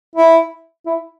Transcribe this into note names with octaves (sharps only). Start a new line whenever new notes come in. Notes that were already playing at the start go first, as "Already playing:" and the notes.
E4
E4